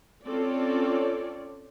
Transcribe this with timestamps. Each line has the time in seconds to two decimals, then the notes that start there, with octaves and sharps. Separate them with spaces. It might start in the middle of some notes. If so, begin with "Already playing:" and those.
0.25 C4 C#4 F4 A4 C#5 D5